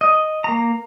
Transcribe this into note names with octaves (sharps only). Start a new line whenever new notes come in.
D#5
A#3 A#5